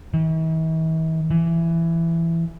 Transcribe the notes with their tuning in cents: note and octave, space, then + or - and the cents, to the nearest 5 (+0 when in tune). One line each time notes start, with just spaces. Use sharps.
E3 -45
E3 +15